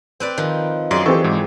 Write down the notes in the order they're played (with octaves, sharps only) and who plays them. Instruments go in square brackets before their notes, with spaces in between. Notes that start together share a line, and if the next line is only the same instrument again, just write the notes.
[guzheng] C4 B4 D5
D#3 F3
[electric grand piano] F#2 C6 [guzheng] G#4 D5
[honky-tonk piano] E3 C4 G4 [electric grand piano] A4 C#6
[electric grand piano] G#2